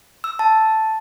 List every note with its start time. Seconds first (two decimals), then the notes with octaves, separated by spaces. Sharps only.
0.24 E6
0.39 A5